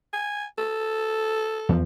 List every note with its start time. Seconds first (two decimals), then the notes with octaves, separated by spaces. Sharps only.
0.13 G#5
0.58 A4
1.69 E2 F3